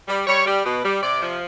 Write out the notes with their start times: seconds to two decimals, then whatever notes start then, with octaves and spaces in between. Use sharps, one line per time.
0.08 G3
0.27 G3 C#5
0.46 G3
0.66 B2
0.84 G3
1.03 C3 D5
1.22 F3